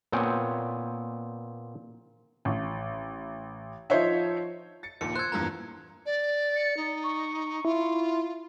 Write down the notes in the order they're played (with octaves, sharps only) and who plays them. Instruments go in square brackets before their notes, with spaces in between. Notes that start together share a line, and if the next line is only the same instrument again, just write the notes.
[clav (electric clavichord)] A#2 B3 C4 C#5 G5 G#5
[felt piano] A1
F3 D#4 F4 C5 C#5 E5
[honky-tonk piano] A6 C#7
[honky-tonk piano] A#1 D#2 A#2 [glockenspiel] C#7
[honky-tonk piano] C5 E6 [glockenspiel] F#6 G#6
[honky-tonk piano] E2 G2 A#2 [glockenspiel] A#5
[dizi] D5
[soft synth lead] C#7
[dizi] D#4
[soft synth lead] C#6
[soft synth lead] E4 [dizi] F4